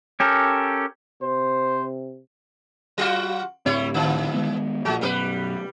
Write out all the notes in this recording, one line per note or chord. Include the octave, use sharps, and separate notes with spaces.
C#4 G4 A4 A#4
C3 C5
F#3 F4 F#4
D2 A2 G3 C4 E4 C#5
D3 E3
D#3 G#3 B3
A#1 A#2 G#3 F#4
B1 F#2 B2 G3 A4 B4